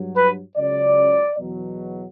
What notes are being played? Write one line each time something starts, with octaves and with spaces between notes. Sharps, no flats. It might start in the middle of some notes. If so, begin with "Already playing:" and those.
Already playing: G2 F#3
B4
C#2 C#3 F#3 D5
E2 B2 F#3